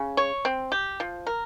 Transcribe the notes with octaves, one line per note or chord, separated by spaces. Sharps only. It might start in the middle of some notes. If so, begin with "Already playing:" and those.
Already playing: C#3
C#5
C4
G4
F3
A#4